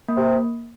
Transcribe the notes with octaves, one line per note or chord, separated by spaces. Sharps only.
A#3
C3